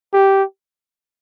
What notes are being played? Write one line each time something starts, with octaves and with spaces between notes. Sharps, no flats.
G4